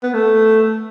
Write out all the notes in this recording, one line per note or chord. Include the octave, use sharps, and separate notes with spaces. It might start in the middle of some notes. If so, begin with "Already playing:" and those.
B3
A3